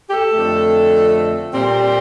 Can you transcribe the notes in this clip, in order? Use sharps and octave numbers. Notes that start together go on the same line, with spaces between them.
G4
A4
F2 D3 A3
A#2 G3 C4